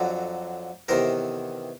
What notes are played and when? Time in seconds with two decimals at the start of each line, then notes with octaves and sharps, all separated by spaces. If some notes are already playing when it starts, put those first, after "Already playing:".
Already playing: F2 D3 F#3
0.88 E2 C3 D#3 A#4 C5